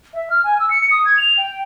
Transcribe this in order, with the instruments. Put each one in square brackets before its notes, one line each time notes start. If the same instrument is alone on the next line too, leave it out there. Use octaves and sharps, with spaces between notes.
[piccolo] E5
F6
G#5
E6
C#7
D#6
G#6
F7
G5